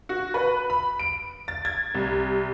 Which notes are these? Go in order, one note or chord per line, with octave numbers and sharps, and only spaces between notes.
F#4
B4
B5
D7
A6
G#6
C2